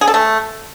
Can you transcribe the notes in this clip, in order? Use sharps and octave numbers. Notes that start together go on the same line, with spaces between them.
G#4
A4
A3